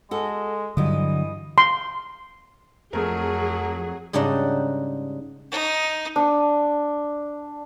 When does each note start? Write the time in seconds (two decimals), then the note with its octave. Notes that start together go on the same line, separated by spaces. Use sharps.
0.11 G#3 F#4 A4
0.77 G2 D3 E3 F#3 D#5
1.58 C6
2.93 F2 F#3 A3 G#4 A#4
4.13 G#2 C#3 G3 D4 D#4 F#4
5.52 D#4
6.16 D4